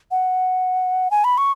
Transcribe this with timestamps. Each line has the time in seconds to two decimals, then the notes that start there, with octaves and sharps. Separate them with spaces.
0.11 F#5
1.11 G#5
1.24 B5
1.38 C#6